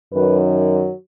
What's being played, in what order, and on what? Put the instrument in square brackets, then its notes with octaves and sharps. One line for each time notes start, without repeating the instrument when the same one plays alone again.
[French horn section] F#2 D#3 F#3 B4